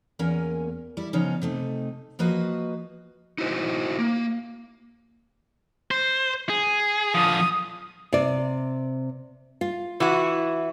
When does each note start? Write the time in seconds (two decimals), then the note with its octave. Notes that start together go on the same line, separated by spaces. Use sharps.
0.19 E2 A#3 C#4 A#4 G#5
0.97 G3 E4
1.13 C#3 F3 B3 C#4 D#4
1.42 C3 A3 D#4
2.19 F3 A#3 F#4 B4 D#5
3.38 D#4 E4 F#4 C5 D#5
3.99 A#3
5.91 C5
6.49 G#4
7.14 D3 F3 D#6
8.13 C3 D5
9.61 F4
10.00 E3 E4 F#4